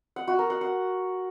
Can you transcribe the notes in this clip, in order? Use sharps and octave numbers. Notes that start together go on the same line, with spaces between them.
F#5
F#4
A#4
F#5
F#5